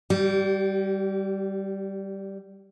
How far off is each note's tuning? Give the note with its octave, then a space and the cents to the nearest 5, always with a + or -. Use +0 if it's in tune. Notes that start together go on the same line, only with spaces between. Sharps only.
G3 -5 G4 -40